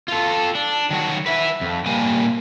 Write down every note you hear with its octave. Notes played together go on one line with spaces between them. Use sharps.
F4 A4
D4
D#3 F#3 F#4
B4 E5
F2
A#2 G3 A#3 G#5